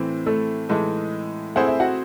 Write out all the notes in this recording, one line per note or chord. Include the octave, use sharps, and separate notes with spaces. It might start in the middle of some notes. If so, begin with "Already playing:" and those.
Already playing: A2 E3 C4
A3 A4
A2 E3 G#3 D#4 A4
A3 C4 E4 G#4 C5 F#5
E5
F#4 F#5